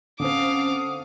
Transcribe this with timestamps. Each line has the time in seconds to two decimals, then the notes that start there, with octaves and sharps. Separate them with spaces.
0.20 D3 C4 C#4 F5 F#5 A5 D6 D#6